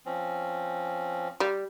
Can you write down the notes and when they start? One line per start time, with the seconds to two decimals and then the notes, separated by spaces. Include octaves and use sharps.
0.06 F3 C4 C#4
1.40 G3